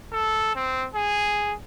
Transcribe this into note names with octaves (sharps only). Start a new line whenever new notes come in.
A4
C4
G#4